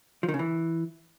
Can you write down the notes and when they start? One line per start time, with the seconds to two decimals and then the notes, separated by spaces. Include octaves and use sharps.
0.23 F3
0.29 D#3
0.34 C#3
0.39 E3